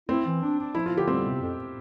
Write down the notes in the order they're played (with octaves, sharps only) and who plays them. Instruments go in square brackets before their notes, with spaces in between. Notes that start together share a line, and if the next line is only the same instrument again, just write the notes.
[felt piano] C4 [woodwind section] E4
[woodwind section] E3
D4
D4
[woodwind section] F3 [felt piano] E4
[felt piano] F4
[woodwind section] D3
[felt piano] G4
[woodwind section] G3 [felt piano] C4
[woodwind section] C3
F2